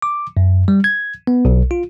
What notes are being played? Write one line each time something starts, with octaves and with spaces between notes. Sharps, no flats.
D6
F#2
G3
G#6
B3
B1
F4